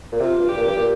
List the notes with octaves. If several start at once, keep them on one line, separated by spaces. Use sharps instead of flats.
A#2
C3 F4
G2
G4
A#2
G2
A#2